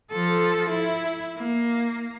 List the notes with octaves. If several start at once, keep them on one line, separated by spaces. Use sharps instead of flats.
F3 A4
E4
A#3